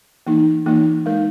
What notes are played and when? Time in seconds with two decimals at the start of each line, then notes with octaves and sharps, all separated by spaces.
0.27 E3 A#3 D#4
0.66 E3 A#3 D#4
1.06 G#3 D#4 A#4